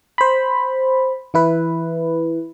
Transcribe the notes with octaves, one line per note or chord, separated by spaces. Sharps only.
C5 B5
E3 E4 B4